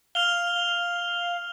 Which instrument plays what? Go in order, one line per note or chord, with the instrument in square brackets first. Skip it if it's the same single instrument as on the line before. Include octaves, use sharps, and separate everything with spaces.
[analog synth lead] F5 [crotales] F6 F7 G7